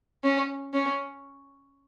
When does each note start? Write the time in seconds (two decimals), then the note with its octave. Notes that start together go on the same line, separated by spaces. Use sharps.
0.24 C#4
0.74 C#4